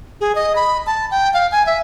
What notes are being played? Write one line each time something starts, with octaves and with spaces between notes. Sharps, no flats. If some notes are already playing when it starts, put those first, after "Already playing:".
G#4
D#5
B5
A5
G5
F5
G#5
E5